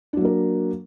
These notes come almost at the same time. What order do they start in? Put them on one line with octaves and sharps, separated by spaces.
D4 F#3 A#3 A#4